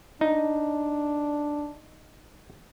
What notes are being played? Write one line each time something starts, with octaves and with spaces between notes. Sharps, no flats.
D4 D#4